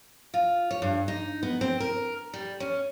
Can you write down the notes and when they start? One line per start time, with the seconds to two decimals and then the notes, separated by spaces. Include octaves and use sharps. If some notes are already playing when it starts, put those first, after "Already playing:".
0.34 F4
0.71 C#5
0.82 G2
1.08 D#4
1.43 B3
1.61 C4
1.80 A#4
2.34 G3
2.60 C#4